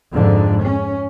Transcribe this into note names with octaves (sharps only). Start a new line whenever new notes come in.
F2 G#2 D3
C#4